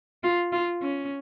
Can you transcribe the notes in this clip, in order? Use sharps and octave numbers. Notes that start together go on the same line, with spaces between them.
F4
F4
C#4